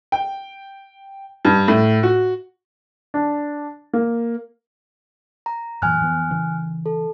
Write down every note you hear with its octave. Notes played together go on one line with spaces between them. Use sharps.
G5
G2
A2
F#4
D4
A#3
A#5
F#2 A#2 E3 G#5 F6 F#6
F2 E3 B3
C#3 E3
A4